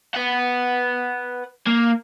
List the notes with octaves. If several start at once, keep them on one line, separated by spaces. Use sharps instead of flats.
B4 F#5
A#3